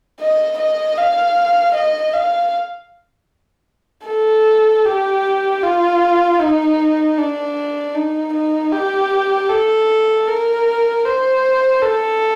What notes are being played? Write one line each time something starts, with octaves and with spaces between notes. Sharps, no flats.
D#5
D#5
F5
D#5
F5
A4
G4
F4
D#4
D4
D#4
D#4
G4
A4
A#4
C5
A4